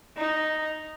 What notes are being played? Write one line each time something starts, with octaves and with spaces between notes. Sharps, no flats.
D#4